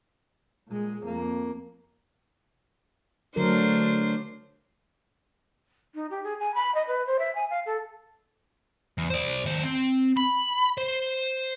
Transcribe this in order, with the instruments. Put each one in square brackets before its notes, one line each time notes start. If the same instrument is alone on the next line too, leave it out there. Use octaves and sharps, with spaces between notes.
[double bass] A#2 G#3
F2 A#3
[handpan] D3 F#3 A#4 [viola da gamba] A3 D4 C5
[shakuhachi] D#4
G4
G#4
G#5
B5
D#5
B4
C5
E5
G#5
F5
A4
[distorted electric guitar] E2
C5 D5
D#2 C5
C4
B5
C5